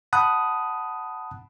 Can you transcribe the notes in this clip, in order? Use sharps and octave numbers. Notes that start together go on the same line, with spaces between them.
F#5 A5 B5 D#6 F#6